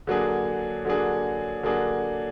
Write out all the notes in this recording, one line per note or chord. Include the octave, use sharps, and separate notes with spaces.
D3 F#3 A#3 D4 G#4
D3 F#3 A#3 D4 G#4
D3 F#3 A#3 D4 G#4